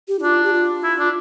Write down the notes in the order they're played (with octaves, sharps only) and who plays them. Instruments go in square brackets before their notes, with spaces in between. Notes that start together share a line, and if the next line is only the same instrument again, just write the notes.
[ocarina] G4
E4
[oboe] D4 [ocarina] F4
[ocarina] G4
F4
[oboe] E4
D4